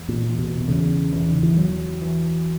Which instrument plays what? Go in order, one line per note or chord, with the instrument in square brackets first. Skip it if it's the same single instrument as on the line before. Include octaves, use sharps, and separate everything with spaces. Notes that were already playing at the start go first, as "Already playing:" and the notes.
Already playing: [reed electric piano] E2
[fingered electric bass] A#2
[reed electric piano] E2
[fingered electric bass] B2
B2
[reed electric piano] E2 [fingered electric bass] C#3
[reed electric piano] E2 [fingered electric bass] C#3
[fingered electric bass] D#3
E3
[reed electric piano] C#2 [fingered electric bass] F#3
[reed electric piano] E3